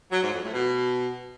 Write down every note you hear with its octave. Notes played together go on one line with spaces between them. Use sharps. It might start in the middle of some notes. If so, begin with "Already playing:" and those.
F#3
G#2
F2
A2
B2